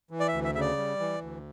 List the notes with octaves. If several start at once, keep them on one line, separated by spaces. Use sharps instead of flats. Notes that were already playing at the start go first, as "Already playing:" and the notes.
E3
D5
E5
D2
E5
C#3 E5
D5
G3
E3
D2